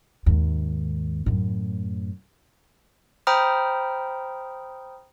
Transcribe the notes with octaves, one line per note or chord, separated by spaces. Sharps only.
D#2 G#2
F#2 A2
C5 G5 A#5 B5 D#6 F6